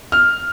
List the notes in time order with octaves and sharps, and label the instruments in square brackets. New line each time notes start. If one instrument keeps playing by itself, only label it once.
[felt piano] F6